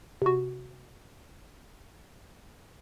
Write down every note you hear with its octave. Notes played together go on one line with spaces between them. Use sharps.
C3 F#4